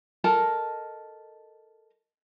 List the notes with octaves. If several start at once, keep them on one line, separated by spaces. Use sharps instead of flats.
A4 A#4 D#5 A5